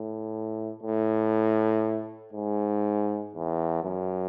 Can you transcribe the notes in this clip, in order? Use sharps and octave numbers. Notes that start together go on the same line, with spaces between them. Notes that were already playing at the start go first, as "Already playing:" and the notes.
Already playing: A2
A2
G#2
E2
F#2